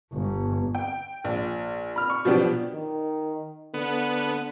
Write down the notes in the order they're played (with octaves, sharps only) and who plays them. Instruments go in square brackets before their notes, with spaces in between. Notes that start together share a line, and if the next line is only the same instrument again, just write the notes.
[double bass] G1
[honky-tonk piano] G5
A#1
B5 F6
C#6
B2 F3 F#3 B3 D4 G4
[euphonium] D#3
[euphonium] D3 [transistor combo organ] B3